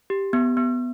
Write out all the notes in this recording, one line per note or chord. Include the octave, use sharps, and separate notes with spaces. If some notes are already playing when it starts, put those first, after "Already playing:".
G4
B3
B3